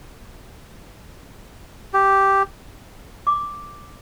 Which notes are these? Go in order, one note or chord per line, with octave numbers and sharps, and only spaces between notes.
G4
D6